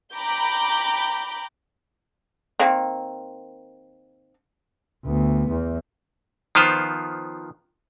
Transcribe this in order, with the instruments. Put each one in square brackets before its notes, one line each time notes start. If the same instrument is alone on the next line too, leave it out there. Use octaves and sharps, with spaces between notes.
[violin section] G5 A#5 B5 D6 G6
[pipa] D#3 A#3 C4
[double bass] D2 B3
E2
[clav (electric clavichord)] D#3 F3 B3 F4 C5